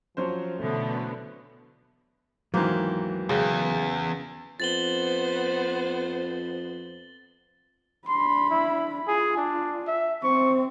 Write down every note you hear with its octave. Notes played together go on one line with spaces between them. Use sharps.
F3 F#3 C#4 C5
B2 D3 E3 A3 B3
D#2 G#2 E3 F#3 A#3 B3 C5
E2 C#3 G5
F2 B3 C5 A6 F#7 G7
D4 B5 C6
E4
F4 G#4
D4
E5
C4 C5 C#6